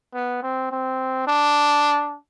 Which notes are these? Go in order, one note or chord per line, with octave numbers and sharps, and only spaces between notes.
B3
C4
C4
D4